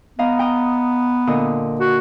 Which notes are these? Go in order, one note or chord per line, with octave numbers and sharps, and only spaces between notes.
B3 D#5 F5 A#5
G5 A#5 D#6
A#2 D3 D#5
F#4